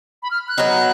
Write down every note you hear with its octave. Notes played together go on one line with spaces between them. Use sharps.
B5
F6
F#6
F#3 B3 D#4